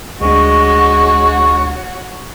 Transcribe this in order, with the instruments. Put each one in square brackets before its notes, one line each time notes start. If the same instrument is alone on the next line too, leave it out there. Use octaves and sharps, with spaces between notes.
[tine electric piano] D2 D4 [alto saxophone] G#3 [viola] F#4 C#5 [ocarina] C#6